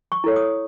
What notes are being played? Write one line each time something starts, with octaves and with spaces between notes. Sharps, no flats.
C#6
E4 A4 C#5
D#6